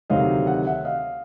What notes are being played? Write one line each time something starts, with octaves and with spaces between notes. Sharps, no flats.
D2 C3 D#3 F#3 D#5 F5
F#5
E5 F#5
D#5 F5